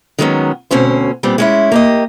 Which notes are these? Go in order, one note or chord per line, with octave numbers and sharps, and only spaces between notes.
D#3 F#3 G#3 A#3 B3 C#4
D2 B2 C4 C#4 C5
A#2 G3 B3 C4
G#3 C#4 E4
A#3 G4 D#5